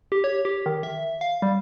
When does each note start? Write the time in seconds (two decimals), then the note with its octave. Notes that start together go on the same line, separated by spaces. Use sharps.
0.12 G4
0.24 C#5
0.45 G4
0.66 D#3
0.83 E5
1.21 F5
1.42 G3